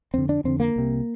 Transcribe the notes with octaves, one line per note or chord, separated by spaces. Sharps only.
F2 D3 C4
D4
F2 D3 C4
A#3
C2 C3